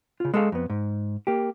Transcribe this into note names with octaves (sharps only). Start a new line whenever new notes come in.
C#3 F4
G#3 A4 F5
F2 B3
G#2
A#3 G4